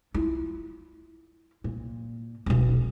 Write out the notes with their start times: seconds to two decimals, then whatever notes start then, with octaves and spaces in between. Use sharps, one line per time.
0.14 E4 F4
1.64 A#2
2.46 D#1 B1